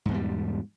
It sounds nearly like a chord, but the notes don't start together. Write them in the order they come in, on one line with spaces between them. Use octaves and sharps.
G#2 E2 B2 G3